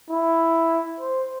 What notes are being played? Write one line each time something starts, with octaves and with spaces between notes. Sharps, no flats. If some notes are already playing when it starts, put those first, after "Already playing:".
E4
C5